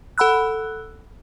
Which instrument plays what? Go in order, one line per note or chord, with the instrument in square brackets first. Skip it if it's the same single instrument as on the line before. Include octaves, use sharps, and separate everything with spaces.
[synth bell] A4 F#5 B5 E6 F#6